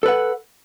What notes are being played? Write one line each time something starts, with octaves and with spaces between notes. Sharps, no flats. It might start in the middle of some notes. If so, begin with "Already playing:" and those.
A4 B4 F#5